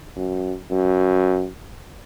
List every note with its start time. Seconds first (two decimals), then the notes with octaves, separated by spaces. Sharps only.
0.16 F#2
0.71 F#2